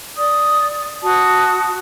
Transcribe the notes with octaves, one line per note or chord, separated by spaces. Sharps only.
D5 D#6
F#4 A5 D#6